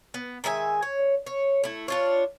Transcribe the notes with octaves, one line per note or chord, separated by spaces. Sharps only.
B3
D#3 G#3 E5 G#5
C#5
C#5
A3 E4
D4 F4 C#5